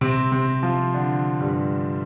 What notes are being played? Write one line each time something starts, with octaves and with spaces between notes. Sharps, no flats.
C3 C4
C3 C4
F3 F4
D3 D4
G2 G3